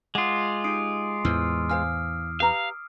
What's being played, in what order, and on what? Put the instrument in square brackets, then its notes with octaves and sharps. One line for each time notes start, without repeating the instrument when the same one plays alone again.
[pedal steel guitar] G#3 F4 [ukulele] F#5 [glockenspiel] D6 D#6
[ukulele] D#4 G4 [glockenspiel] D#6 C7 D7
[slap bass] E2 A2 E3 [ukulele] C5 [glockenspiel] E6 F6
[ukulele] C5 F5 G#5 [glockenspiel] F6
[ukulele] G4 B4 A#5 [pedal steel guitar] F5